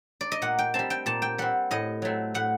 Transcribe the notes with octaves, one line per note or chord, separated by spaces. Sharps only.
D5
D#5
A#2 F#5
G5
G3 C4 A5
G5
A#2 A5
G5
G3 C4 F#5
A2 D#5
F#3 A3 C4
A2 F#5